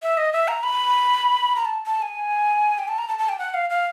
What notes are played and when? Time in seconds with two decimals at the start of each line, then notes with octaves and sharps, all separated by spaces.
0.03 E5
0.17 D#5
0.33 E5
0.48 A#5
0.63 B5
1.56 A#5
1.65 A5
1.86 A5
2.02 G#5
2.78 G5
2.88 A5
2.98 A#5
3.08 A5
3.19 A5
3.29 G5
3.39 F#5
3.54 F5
3.70 F5